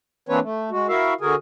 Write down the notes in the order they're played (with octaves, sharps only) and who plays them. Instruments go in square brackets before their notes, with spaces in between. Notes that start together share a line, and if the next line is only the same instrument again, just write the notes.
[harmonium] E3 A#3 C4 D4 B4 C#5
A3
G#3 F#4
E4 F#4 A#4 E5 F5
D3 F#4 G#4 A#4 G#5